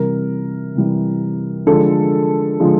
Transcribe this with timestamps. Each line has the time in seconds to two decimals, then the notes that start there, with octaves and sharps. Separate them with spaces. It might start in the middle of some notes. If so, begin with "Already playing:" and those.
Already playing: C3 E3 G3 A#4
0.75 C3 E3 G3
1.66 D3 F3 G#3 A4
2.60 D3 F3 G#3